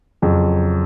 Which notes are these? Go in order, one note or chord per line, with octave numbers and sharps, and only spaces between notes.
F2 C#3 F#3